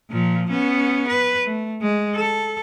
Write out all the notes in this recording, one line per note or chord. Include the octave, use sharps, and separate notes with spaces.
A#2 F3
B3 C#4
B4
A3
G#3
A4